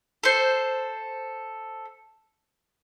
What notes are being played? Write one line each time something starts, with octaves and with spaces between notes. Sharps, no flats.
A4 C5